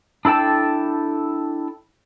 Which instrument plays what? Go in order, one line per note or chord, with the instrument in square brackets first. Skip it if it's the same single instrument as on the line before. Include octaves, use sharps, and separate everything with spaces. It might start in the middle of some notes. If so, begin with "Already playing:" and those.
[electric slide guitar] D4 E4 A4 G5 A5